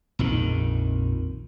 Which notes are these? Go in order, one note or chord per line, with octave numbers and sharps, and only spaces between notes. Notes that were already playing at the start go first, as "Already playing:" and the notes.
A#1 F2 D#3